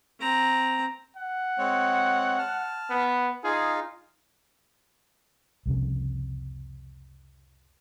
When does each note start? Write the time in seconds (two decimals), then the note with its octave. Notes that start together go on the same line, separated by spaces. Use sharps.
0.20 C4 A#5
1.17 F#5
1.58 G#3 C4 C#5
2.38 A5 F6
2.90 B3
3.44 D#4 F4 G#4 F5
5.66 C2 F2 C#3